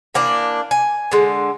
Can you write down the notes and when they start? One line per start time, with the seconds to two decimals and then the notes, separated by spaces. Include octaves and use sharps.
0.15 E3 A#3 D4 D5
0.71 G#5
1.12 D3 G#3